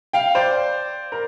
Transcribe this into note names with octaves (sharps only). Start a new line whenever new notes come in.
F5 G5
C5 D5
A#4